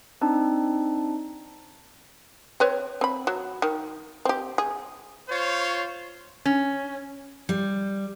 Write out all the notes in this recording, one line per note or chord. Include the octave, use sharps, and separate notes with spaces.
C4 D4 D#4
C4 B4 C#5
C4 B5
F#3
D#3
C4 G4
G#4
F4 C5 C#5
C#4
G3